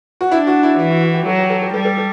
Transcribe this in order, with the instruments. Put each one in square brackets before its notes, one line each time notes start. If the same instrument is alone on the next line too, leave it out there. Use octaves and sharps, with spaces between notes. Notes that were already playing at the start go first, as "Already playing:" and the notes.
[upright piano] F#4
[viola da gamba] D4 [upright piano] E4
[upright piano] F#4
E4
[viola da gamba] E3 [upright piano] E4
[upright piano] F#4
F#4
G4
[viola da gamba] F#3 [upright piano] A4
[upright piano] G4
A4
G4
[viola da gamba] G3 [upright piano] A4
[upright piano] A4
A4